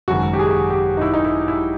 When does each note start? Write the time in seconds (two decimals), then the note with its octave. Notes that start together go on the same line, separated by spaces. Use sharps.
0.08 G#1 F#2 C#3 F#4
0.33 G4
0.39 G#4
0.70 G4
0.97 D#4
1.01 E4
1.14 D#4
1.25 E4
1.48 E4